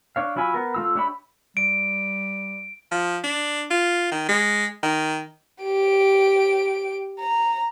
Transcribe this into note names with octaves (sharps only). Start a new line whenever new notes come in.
D4 C#5 F5
F#3 E4 F4 G#5 B5
B3 A#4
A3 F4 E6
D4 G4 C#5 E5 B5
G3 D7
F3
D4
F4
D#3
G#3
D#3
G4 D7
A#5